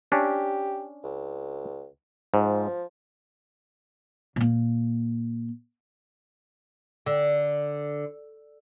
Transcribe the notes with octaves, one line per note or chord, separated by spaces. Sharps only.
C#4 D4 G4
C#2
G#2 F3
A#2 A#3
D3